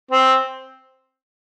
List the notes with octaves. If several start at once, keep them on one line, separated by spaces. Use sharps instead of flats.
C4